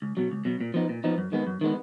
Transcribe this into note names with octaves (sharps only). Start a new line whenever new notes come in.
C#2
B2 F#3
C#2
B2 F#3
A#2
F3 B3 D#4
A#2
F3 B3 D#4
F#2
D#3 G#3 B3
F#2
D#3 G#3 B3